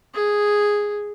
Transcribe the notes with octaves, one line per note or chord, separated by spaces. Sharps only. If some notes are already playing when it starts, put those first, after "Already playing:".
G#4